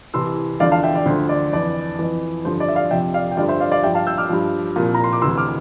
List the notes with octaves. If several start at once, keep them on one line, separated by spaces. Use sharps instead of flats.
C2 C3 E3 C6 E6
E2 D3 F3 D5 F5
F5 A5
E5 G5
D5
D2 D3 F3 C5
D5
F2 E3 D5
F2 E3
G2 D3 F3 C5
D5
E5
D5 F5
F2 C3 F3 E5 G5
D5 F5
G5
G2 D3 F3 D5 F5
C5 E5
D5 F5
D5 F5
G2 F3 E5 G5
F5 A5
E6 G6
D6 F6
G2 F3
C2 A#2 F3
A#5
C6
D6
D2 C3 E3 C6 E6
D6 F6